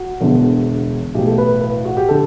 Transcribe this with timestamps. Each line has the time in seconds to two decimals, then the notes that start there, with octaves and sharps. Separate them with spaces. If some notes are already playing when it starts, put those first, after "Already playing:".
Already playing: F#4
0.21 E1 E2 D3
1.15 B1 A2 E3 G4
1.27 A4
1.38 B4
1.62 B4
1.85 F#4
1.97 G4
2.09 D3 A4